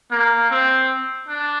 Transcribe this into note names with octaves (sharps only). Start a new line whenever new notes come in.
A#3
C4
D4